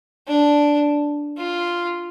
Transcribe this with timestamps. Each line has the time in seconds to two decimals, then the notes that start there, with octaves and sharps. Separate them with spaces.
0.28 D4
1.37 F4